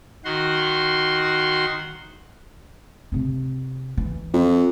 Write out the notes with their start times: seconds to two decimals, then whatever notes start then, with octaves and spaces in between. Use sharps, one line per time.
0.25 D#3 F#4 C6
3.12 C3 C4
3.97 E3
4.34 F2